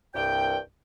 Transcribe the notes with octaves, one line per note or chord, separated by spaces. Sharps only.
C2 G2 G5